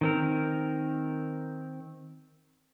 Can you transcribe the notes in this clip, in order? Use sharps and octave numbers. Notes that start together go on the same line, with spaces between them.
D#3 C4 A#4